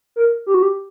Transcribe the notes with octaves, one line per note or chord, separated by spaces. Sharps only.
A#4
G4
F#4
G4